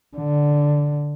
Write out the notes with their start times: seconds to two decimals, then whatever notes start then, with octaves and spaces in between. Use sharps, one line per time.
0.16 D3